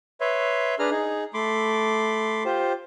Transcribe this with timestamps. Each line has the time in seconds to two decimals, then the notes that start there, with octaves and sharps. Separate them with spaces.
0.21 B4 C#5 E5 C6
0.79 D4 G#4 B4 A#5 F6
0.91 D#4 G#4
1.34 A3 B5 C6 D6
2.45 F4 G4 C5